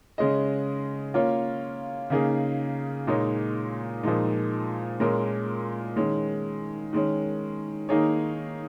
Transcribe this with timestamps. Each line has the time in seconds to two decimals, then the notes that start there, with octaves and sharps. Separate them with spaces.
0.18 C#3 G#3 C#4 G#4 D#5
1.14 A#3 C#4 F4 C#5
2.10 C#3 A#3 D#4 G#4
3.07 A#2 G#3 D#4 C#5
4.03 A#2 F3 G#3 D#4
5.00 A#2 G#3 C#4 A#4
5.96 D#3 G#3 C#4
6.93 D#3 G#3 C#4
7.89 D#3 A#3 D#4 G#4 C#5